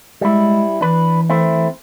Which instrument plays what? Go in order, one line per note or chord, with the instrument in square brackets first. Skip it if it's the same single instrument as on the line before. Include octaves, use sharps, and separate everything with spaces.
[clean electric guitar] G3 E4 [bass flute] G#3
[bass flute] E3 [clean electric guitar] D4 B4
[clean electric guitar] A3 C4 E4